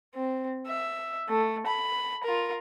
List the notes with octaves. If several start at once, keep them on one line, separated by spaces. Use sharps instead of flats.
C4
E5
A3
B5
F4 A#4